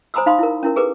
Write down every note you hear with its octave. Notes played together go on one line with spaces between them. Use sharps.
C5 G#5 A#5 B5 D#6 E6
D#4 F5 B5 C6 D#6
E4 A#4
C#4 E4 A#4
G4 G#4 A#4 B4 D6